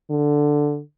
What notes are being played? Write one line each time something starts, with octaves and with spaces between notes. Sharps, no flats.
D3